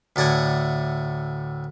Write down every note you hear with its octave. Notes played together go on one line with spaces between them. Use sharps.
D2 A2 D5 F#5 G#5